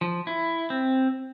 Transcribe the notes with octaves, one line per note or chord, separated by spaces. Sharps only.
F3
E4
C4